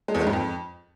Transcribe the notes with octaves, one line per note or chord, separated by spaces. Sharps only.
G#3
E2
G#3
G#2
F2